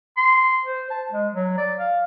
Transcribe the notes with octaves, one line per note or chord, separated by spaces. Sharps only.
C6
C5
A5
G#3
F#3
D5
F5